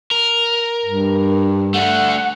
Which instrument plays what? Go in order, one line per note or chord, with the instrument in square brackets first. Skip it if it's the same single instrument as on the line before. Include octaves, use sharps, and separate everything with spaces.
[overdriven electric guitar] A#4
[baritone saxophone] G2
[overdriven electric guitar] A3 D4 [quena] F#5